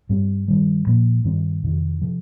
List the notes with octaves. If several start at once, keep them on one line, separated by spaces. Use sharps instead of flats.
G2 G3 C4
G2 D#3 G3
A#2 F3 A#3
G2 D#3 C4
F2 C3 D#3
C3 F3